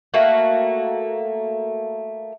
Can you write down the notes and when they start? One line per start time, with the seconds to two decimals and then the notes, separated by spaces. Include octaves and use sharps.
0.14 A3 A#3 F#4